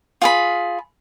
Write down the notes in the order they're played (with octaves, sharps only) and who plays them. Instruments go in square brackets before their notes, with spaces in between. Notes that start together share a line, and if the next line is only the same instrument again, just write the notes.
[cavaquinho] F4 G#4 B5